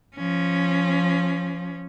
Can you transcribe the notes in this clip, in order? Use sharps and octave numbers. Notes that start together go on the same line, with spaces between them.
F3 C#4